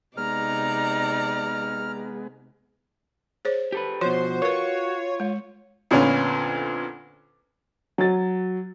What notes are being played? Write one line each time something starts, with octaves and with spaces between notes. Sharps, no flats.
C3 G#3 B3 D#4 D5 A#5 F6
G#4 C5 C#5
G4 A4 B4
B2 F3 F#4 C5 C#5
F4 A#4 B4 C#5
G#3 C#5
F2 A#2 D3 B3 C#4 F4
F#3 A6